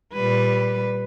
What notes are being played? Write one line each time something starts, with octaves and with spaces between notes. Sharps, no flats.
A#2 G3 B4